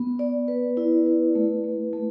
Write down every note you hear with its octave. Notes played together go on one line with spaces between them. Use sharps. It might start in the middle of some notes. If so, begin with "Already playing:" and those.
Already playing: B3
D5
B4
E4
B4
A3
A3
A3